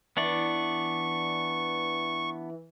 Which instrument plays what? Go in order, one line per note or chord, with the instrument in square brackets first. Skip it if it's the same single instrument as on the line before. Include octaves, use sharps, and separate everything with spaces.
[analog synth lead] E3 [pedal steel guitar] B3 D4 D5 [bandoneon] C#6